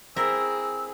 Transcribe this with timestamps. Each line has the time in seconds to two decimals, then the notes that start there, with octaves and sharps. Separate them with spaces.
0.16 C4 E4 G#4 A#4 E6